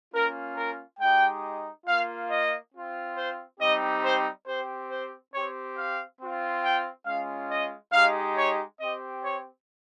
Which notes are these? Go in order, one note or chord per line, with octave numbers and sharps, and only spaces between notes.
A#3 C#4 F4 A#4
A#4
G#3 D#4 G4 G5
A#3 F4 F5
D#5
C4 F4
C5
G3 C4 D#4 G4 D#5
C5
C4 G4 C5
C5
C4 G4 C#5
F5
C4 F4
G5
G#3 C#4 F4 F5
D#5
G#3 D#4 G4 F5
C#5
C4 D#5
G4
C#5